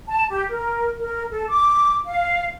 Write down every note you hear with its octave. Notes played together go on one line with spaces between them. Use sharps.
A5
G4
A#4
A#4
A4
D6
F5